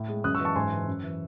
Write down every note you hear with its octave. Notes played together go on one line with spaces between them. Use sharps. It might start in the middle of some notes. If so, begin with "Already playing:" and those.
Already playing: A2
G#3
F#2 D#6 F#6
C#6 E6
E3
A5 C#6
G#2 G#5 C6
E3
F#2
E3